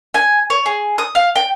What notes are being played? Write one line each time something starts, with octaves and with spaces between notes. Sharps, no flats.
G#5
C#5
G#4
D#6
F5
G5